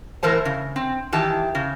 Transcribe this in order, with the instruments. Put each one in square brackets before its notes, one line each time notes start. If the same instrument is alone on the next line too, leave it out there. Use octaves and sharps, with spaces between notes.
[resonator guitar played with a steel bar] A2 E3 A#4 C5 A5
C#3
C4
D#3 E3 G4 A5
C#3